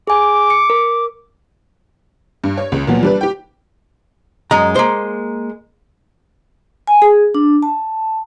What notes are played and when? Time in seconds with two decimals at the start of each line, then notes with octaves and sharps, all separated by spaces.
0.07 G#4 G#5 D6
0.50 C#7
0.70 A#4
2.44 G2
2.57 C#5
2.72 C#2
2.87 A#2 F3 F#3 B3
3.03 G3 D4 B4
3.21 G4 G5
4.51 F#2 G#3 A#5
4.76 A#3 C5
6.87 G#5
7.02 G#4
7.35 D4
7.63 A5